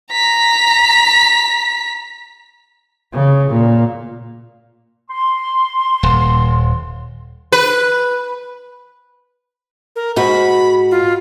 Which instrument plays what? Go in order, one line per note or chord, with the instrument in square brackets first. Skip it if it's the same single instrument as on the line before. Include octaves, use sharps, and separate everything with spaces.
[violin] A#5 B6
[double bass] C#3
A#2
[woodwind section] C6
[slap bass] D#1
[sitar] B4
[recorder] A#4
[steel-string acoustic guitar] G#2 F#4 [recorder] B5
[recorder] F4